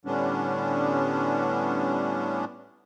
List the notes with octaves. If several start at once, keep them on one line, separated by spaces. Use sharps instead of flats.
A2 D3 G3 B3 C#4 D4